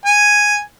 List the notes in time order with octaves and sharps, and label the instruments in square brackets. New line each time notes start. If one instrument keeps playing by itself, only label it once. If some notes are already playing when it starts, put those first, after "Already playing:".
[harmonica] G#5